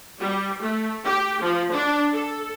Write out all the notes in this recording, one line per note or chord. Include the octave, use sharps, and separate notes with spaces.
G3
A3
G4
F3
D4
A4